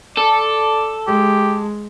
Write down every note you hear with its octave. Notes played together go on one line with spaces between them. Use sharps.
A4 D5
G#3 G4